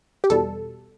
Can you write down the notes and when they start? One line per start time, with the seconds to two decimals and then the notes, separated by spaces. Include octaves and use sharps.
0.24 G4
0.30 E2 B2 G3 A4